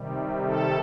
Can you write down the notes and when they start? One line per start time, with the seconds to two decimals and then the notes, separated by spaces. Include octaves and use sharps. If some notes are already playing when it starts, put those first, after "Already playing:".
Already playing: C3 D#3 G3
0.43 A4